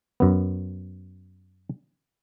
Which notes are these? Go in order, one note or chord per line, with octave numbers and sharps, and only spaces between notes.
F#2 B3